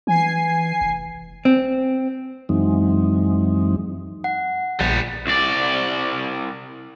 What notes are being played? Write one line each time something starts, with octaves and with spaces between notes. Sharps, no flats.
E3 G#5 C7
F1
C4
F#2 E3 F#3 G#3 C4 D#4
F#5
A#1 G3 B3
C2 D5